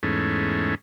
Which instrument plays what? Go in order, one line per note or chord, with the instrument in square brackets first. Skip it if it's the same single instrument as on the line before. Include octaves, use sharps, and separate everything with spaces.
[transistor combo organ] E2 G#2 A3 C#4